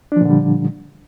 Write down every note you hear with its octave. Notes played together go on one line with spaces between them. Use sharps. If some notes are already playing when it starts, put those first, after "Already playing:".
A#2 D3 F3 G3 D4